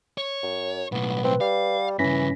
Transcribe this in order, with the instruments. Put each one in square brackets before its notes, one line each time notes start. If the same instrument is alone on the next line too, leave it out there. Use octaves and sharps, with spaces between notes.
[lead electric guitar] C#5
[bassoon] F#2
[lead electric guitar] B1 A2 [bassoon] B3
[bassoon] C4 [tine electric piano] B4
[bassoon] G3 [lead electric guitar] F5
[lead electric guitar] G2 C#3 [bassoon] E3 [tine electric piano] C#4 A#6 B6